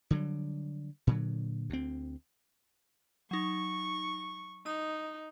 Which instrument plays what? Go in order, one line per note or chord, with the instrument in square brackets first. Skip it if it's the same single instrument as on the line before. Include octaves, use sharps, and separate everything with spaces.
[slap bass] D3 F#3 G3
A#2 D3 F#3
D2 C4
[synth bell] F#3 D#4 [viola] C#6
[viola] D#4 [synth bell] D#6